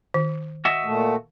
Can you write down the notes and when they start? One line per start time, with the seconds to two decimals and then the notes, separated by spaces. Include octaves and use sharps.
0.14 D#3
0.65 F#4 D#5 E5
0.85 A#2 A3